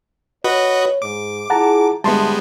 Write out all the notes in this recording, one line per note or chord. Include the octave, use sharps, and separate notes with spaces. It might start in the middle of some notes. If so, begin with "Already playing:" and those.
F#4 B4 C#5 D#5
G#2 D6
E4 F4 G#4 F#5 A5 A#5
G1 D2 G3 G#3 B3 E5 A5 C6